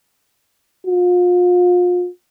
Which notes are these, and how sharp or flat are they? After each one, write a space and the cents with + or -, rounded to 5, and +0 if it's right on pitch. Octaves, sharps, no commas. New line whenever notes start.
F4 +35